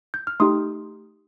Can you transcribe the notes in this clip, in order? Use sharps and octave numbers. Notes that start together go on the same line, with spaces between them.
G6
F6
A3 D#4 G4 C6 D#6